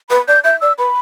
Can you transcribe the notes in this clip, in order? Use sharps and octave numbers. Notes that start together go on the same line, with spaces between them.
B4 B5
D5 G6
E5 G6
D5 E6
B4 B5